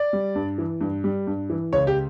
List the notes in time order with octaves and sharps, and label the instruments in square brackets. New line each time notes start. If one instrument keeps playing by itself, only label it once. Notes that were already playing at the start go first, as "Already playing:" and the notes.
Already playing: [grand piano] D5
G3
G2
E3
G2
G3
G2
E3
C#2 C#5
G4